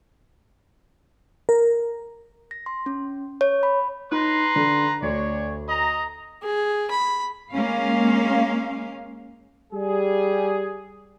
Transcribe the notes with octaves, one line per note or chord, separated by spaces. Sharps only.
A#4
A#6
C6
C#4
C#5
B5
D#4 B4 A#5 C6
D3
D2 D4 C#5
D#5 A#5
G#4
B5
G#3 A#3 C#4 F5
G3 G#4